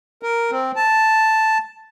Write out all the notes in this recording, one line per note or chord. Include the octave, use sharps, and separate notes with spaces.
A#4
C4
A5